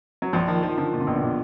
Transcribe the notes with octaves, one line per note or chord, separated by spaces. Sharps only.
F#3
A#1 F3
D#3 F3
D#3 F3
D3 F3
A#2 D#3
D3
A#1 B2
D3
A#2